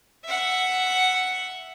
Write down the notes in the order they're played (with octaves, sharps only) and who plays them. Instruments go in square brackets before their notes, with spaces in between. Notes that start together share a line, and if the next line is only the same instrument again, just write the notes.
[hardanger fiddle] E5 F#5